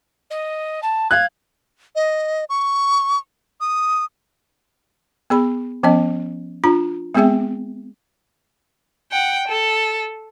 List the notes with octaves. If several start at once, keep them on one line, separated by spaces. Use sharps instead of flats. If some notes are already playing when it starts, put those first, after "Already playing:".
D#5
A5
F5 F#6 G#6
D#5
C#6
D#6
B3 G#4 B5
F3 B3 C#4 D#5
D4 F4 A#5
G#3 B3 C4 G#4 E5 G5
F#5 G5
A4